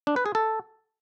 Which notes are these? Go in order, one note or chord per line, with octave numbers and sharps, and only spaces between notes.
D4
B4
G#4
A4